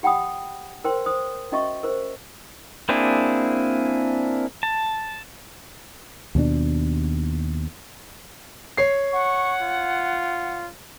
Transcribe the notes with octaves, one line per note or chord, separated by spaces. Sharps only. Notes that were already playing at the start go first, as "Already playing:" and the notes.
G4 F#5 G5 B5 D#6
A#4 C5 G5 C6
C5 D#6
C#4 F#4 D#5 E5 C#6
A#4 C5
A#3 C4 D4 E4 G#4
A5
D#2 B2 C#4 D4
C#5 C7
F#5 C#6
F4